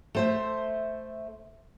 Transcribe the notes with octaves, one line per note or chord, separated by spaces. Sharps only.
A3 C5 E5